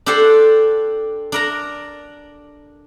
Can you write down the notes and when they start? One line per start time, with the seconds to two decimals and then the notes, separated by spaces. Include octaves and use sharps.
0.06 D4 G4 A4 C5 F#5
1.32 D4 A#4 A#5